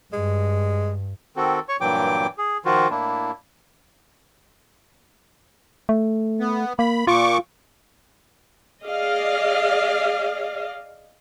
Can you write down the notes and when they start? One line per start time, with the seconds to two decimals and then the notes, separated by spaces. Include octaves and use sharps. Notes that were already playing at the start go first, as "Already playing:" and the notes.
0.13 G2 G#3
1.36 D#3 C4 F#4 A4
1.69 C#5 C#6
1.81 G2 A#2 E3 F#3 G5 D6
2.38 G#4
2.65 D#3 F3 F4 F#4
2.90 A2 A#3 D4 E4
5.89 A3
6.40 B3
6.79 A#3 B5
7.07 A#2 F4 C#6 D6
8.86 G#4 D5 D#5 F5